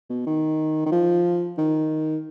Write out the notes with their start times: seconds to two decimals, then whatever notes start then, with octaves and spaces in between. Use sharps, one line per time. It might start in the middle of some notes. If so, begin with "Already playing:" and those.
0.10 B2
0.27 D#3
0.86 D#3
0.92 F3
1.58 D#3